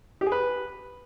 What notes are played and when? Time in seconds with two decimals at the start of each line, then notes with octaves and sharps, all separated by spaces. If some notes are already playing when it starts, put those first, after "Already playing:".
0.21 G4
0.26 G#4
0.32 B4